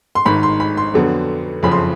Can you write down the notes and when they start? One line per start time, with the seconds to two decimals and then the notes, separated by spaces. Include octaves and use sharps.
0.15 C6
0.25 G#1 G#2 D#3 B5
0.43 C6
0.60 B5
0.77 C6
0.94 F2 D3 F#3 B3
1.63 F#1 F2 C#3 F3 B5
1.72 C6